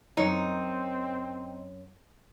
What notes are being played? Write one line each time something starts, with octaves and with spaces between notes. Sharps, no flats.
F#2 C4 D#4 C#5